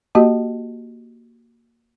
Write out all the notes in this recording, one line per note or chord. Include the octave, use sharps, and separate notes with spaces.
A#3 F#4 G4 D#5 A5